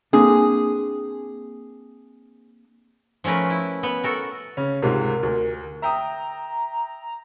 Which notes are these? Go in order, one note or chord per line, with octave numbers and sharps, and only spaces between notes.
A#3 C4 D4 G#4
F3 A3 C#4 A#4 B4
E4
B3
F#4 A4 A#4
C#3 C#4
C#2 G#2 C3 A#4
D2
E5 G5 A#5 D#6